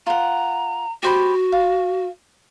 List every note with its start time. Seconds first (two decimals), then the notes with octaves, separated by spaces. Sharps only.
0.07 F4 F#5 A#5
1.03 F#4 G4 C5 B5
1.52 F5